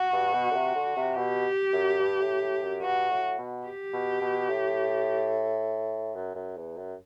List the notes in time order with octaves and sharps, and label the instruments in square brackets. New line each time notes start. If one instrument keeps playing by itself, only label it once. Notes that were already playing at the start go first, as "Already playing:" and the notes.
Already playing: [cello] F#4
[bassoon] G2
B2
D3
C3
D3
C3
[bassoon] B2 [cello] G4
[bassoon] F#2
G2
A2
A2
F#2
[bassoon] G2 [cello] F#4
[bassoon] A2
B2
[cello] G4
[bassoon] B2
B2
A2
F#2
F#2
E2
F#2